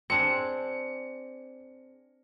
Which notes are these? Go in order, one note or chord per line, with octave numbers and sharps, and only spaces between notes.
C4 D4 G#4 C#7